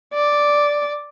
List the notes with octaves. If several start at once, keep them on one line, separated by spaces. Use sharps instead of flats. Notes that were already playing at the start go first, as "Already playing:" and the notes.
D5